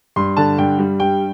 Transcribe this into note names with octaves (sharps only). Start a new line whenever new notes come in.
G2 C6
D3 A5
G2 G5
G3
G2 G5